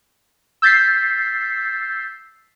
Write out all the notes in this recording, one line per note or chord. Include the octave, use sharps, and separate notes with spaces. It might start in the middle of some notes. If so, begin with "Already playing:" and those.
E6 G6 A6 B6 C7